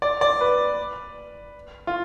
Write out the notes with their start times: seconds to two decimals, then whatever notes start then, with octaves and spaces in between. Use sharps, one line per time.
0.02 D5
0.21 D5
0.41 B4
1.87 F4